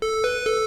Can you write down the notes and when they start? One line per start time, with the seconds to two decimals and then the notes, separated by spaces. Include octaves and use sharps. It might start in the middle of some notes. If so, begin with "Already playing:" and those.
0.02 A4
0.24 B4
0.46 A4